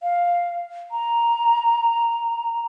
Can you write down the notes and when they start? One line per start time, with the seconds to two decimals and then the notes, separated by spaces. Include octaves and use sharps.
0.03 F5
0.91 A#5